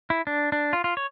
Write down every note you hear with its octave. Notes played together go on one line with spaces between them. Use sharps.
E4
D4
D4
F4
F4
C#5